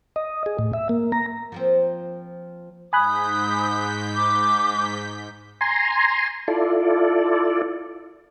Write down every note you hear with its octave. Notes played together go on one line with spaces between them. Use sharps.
D#5
G#4
A2
E5
A#3
A#5
F3 A#3 C4
G#2 G#5 B5 D#6 F#6 G6 B6
D6
G#5 A#5 C6
E4 F4 A4 D5